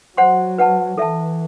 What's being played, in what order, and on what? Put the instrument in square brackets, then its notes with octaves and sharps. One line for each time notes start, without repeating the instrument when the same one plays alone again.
[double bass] F#3 [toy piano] C5 F#5 C6
[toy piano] B4 F#5 A5
[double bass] E3 [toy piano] A4 E5 A5